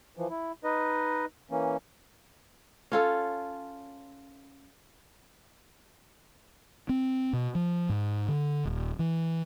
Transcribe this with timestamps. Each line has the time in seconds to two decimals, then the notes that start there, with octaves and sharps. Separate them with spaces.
0.17 E3 F3
0.30 E4
0.64 D#4 B4 D#5
1.51 E3 A#3 C#4
2.92 C#4 F4 A4
6.89 C4
7.33 B2
7.55 F3
7.89 G#2
8.28 D3
8.65 D#1
8.99 E3